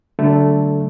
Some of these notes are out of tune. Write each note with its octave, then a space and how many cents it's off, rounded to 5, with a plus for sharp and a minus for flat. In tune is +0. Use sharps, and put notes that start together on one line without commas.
D3 -15 F#3 +25 A3 +0